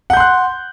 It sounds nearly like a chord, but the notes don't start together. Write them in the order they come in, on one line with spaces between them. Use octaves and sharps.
F#5 G6 C6 F#6